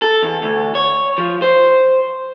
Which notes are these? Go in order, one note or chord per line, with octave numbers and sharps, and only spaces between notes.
A4
E2
D2
C#5
F3
C5